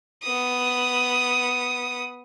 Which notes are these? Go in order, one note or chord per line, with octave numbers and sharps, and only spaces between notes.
B3 D#6